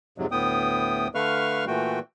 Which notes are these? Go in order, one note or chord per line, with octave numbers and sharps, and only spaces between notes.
F2 G#2 C3 F#3
D2 A2 B3 G5 D#6
D3 A3 B4 F5 C#6 F6
A#2 E3 A3 F#4 G5